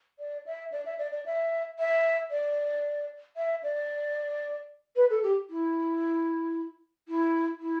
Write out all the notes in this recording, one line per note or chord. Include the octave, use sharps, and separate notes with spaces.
D5
E5
D5
E5
D5
D5
E5
E5
D5
E5
D5
B4
A4
G4
E4
E4
E4